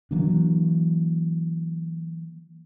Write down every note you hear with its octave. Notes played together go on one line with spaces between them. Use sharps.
E3 F#3 A#3 D4